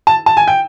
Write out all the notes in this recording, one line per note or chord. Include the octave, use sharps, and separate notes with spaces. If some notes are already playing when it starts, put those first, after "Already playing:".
A5
A5
G#5
G5